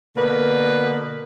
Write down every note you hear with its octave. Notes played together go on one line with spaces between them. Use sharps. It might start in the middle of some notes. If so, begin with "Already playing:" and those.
B2 D3 A#3 B4